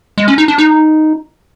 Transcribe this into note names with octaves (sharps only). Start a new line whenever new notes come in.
G#3
C#4
D#4
D4
D#4